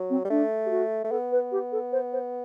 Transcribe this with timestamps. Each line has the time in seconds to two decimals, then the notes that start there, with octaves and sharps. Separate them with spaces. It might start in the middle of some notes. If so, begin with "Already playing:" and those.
Already playing: F#3
0.10 C4
0.25 G3
0.30 A3 D4
0.66 G4
0.70 F#4
1.04 A3
1.10 B3 A4
1.32 B4
1.52 G4
1.72 A4
1.92 C5
2.13 C5